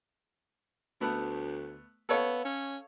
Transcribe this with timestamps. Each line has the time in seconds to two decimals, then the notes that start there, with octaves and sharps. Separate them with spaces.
1.01 D2 A3 B3
2.09 B3 A4 C#5 F5
2.45 C#4